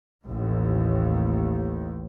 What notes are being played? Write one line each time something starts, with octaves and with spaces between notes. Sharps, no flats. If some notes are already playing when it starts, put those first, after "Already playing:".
A1 D#2 A2